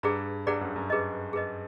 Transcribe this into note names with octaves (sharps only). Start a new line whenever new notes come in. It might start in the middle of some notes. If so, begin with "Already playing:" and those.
G2 G#4 B4 D5 F#5 A#5
G2 G#4 B4 D5 F#5 A#5
F#2
F#2
G#4 B4 D#5
G#4 B4 D#5